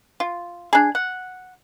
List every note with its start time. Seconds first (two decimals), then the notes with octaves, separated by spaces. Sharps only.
0.20 F4
0.73 D4 G#4
0.95 F#5